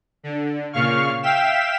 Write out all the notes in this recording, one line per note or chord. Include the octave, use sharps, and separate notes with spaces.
D3
A#2 C#3 F5 C#6 F6
E5 F5 G5 B6 E7